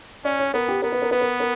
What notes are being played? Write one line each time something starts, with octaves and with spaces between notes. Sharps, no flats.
C#4 D5
C#5
B3 A#4
G4
B3 A#4
B4
A#4
B3 B4
A#4
A#4